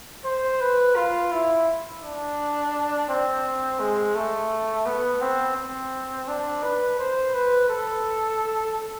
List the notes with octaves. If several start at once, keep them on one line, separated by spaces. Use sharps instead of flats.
C5
B4
F4
E4
D4
C4
G#3
A3
B3
C4
C4
D4
B4
C5
B4
A4